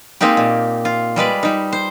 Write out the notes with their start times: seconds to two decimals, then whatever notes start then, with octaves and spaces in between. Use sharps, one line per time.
0.21 G#3 A#3 C4 D#4 G4
0.37 A#2
0.85 F4
1.16 G3 G#3 B4 D5
1.43 G3 D#4
1.73 C5